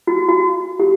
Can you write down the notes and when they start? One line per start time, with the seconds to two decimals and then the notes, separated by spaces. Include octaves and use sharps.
0.07 F#4
0.28 F#4
0.80 G4